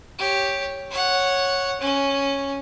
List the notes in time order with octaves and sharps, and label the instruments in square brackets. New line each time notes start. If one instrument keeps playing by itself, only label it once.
[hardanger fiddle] G4 C#5
C#5 F#5
C#4